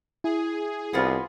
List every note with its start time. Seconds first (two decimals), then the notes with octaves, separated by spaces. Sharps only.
0.24 E4 G#4
0.93 C2 B3 C4 F4